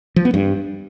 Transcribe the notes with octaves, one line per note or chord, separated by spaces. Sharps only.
F3
B3
G2